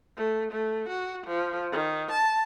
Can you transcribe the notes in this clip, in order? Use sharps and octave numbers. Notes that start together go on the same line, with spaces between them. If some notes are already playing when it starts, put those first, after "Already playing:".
A3
A3
F#4
F3
D#3
A5